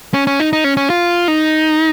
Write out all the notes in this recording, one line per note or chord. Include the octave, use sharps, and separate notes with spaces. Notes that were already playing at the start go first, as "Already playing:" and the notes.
C#4
C#4
D#4
D#4
C#4
C#4
F4
D#4